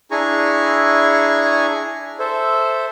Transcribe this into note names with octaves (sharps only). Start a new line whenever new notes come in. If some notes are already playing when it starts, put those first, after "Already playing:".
D4 E4 G#4 G#5 A#5 C#6
A4 C5 E5